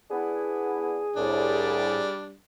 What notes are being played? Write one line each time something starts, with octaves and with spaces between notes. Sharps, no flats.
B3 D4 E4 G#4
C2 A2 G3 D4